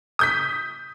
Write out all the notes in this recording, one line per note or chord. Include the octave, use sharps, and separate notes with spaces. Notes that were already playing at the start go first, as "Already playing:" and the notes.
D#6 G6 B6